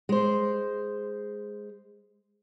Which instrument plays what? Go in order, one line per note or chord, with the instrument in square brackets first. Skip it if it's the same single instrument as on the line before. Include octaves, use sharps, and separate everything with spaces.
[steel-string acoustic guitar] G#3 C5